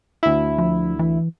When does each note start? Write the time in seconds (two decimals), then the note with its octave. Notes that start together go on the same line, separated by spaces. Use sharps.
0.23 D2 E4
0.58 F3
0.99 E3